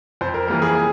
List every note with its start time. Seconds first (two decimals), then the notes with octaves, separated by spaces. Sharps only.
0.21 F2 C5
0.34 A#4
0.47 E3 G3 A#3 A#4
0.62 G#4
0.75 G#4